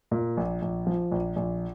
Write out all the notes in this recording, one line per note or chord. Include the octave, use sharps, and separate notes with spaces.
A#2
A#1
A#1
F3
A#1
A#1